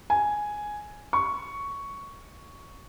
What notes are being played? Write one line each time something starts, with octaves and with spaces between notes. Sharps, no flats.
G#5
C#6